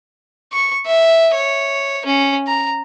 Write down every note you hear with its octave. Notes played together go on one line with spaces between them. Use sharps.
C#6
E5
C#5
C#4
A#5